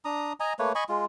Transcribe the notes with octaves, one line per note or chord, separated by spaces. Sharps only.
D4 A#5 D#6
D#5 G#5 A#5
A3 A#3 B4 C#5
D#5 G#5 B5 C#6
G#3 F4